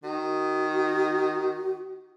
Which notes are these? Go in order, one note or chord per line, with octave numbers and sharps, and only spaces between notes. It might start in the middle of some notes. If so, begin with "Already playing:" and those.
D#3 F#4